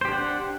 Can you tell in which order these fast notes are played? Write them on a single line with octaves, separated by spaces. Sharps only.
C5 G4 D4 F#5